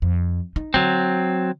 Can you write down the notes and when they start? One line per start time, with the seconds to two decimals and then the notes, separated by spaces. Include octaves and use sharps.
0.02 F2
0.56 D#4
0.74 D3 F#3 C4